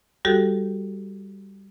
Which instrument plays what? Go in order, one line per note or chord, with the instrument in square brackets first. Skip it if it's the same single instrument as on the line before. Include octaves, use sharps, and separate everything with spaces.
[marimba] G3 F#4 G4 A4